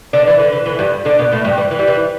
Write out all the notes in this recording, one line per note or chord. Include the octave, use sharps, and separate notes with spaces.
D3 D4
E3
D3
E3
E3
G2 G3
D3 D4
B2 B3
A2 A3
G2 G3
E3
E3
G3
E3